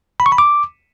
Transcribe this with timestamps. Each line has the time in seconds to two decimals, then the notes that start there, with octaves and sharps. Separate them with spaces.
0.20 B5
0.26 C#6
0.32 B5
0.38 D6